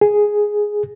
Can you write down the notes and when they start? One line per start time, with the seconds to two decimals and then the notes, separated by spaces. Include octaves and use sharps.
0.01 G#4